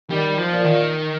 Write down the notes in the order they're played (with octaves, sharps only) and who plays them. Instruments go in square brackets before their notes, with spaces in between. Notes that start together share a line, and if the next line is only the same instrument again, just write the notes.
[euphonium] D#3 [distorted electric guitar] G3
[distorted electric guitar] F3
[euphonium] A#2
[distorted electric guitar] D#3